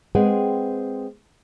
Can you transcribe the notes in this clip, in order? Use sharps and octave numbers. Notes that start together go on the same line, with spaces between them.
G#3 C4 G#4 B4 F#5 G5